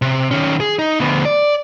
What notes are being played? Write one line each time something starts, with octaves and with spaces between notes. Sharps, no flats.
C3
D#3 C#4
G#4
D#4
D2 B3
D5